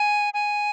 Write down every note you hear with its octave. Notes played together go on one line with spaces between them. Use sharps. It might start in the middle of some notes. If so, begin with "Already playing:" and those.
Already playing: G#5
G#5